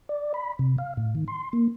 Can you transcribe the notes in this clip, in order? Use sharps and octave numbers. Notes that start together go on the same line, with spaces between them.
D5
B5
C3
F5
A2
D#3
C6
A#3